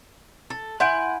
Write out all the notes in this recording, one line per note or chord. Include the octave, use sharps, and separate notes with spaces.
A4
E4 F#5 G#5 C6 G6 D7